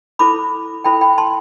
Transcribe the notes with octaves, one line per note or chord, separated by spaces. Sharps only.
E4 A4 C5 B5 D6
E4 A4 C5 G5 B5
G5 B5
A5 C6